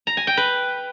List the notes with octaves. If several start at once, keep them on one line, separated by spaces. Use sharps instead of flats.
A#5
G#5
G5
B4